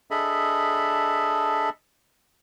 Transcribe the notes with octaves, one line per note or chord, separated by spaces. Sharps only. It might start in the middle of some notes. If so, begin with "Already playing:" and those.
D4 G#4 A4 D#5 E5 B5